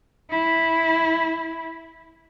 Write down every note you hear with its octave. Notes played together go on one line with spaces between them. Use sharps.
E4